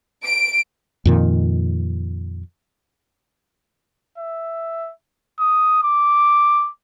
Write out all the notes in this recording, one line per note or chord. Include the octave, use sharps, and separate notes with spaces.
D7
F2 A#2 D#3
E5
D#6
D6